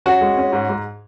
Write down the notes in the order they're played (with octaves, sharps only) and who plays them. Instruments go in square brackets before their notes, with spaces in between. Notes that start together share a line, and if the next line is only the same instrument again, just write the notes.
[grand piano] C#4 F#4
G#3
C#4
G#2
G#2